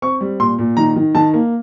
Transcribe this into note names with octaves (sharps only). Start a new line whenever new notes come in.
C4 C#6
G3
A#2 C6
A#2
D#3 A#5
D#3
D#3 A5
A#3